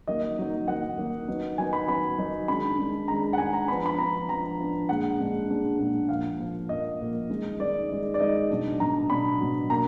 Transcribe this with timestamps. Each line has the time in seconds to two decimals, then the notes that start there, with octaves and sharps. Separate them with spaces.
0.07 D#3 F#3 A#3 D#4 D#5
0.38 D#3 F#3 A#3 D#4
0.67 D#3 F#3 A#3 D#4 F#5
0.97 D#3 F#3 A#3 D#4
1.28 D#3 F#3 B3 D#4
1.58 D#3 F#3 B3 D#4 G#5
1.73 B5
1.88 D#3 F#3 B3 D#4 B5
2.18 D#3 F#3 B3 D#4
2.48 D#3 G#3 D4 B5
2.78 D#3 G#3 D4
3.08 D#3 G#3 D4 A#5
3.33 F#5
3.38 D#3 G#3 D4 G#5
3.53 A#5
3.68 F3 B3 D4 B5
3.86 B5
3.98 F3 B3 D4 A#5
4.29 F3 B3 D4 A#5
4.58 F3 B3 D4
4.89 A#2 G#3 D4 F#5
5.19 A#2 G#3 D4
5.50 A#2 G#3 D4
5.79 A#2 G#3 D4
6.09 A#2 F3 A#3 F5
6.39 A#2 F3 A#3
6.69 A#2 F3 A#3 D#5
6.99 A#2 F3 A#3
7.30 D#3 G#3 D#4
7.59 D#3 G#3 D#4 D5
7.89 D#3 G#3 D#4
8.14 D5
8.20 D#3 G#3 D#4 D#5
8.50 B2 F#3 D4
8.80 B2 F#3 D4 A#5
9.10 B2 F#3 D4 B5
9.40 B2 F#3 D4
9.70 B2 A#3 D4 A#5